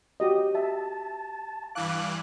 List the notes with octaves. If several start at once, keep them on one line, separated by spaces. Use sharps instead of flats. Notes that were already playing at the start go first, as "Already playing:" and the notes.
F#4 G4 D#5
E5 A5
G2 E3 F5 D6 F#6